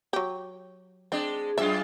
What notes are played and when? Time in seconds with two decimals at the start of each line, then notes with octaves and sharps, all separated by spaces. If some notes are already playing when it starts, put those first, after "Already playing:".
0.13 F#3 G4
1.12 G#3 C4 D4
1.58 F#2 G#3 F4 E5